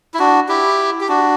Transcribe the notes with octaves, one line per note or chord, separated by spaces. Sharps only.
E4
D4 F#4
E4 G4
G4
D4 F#4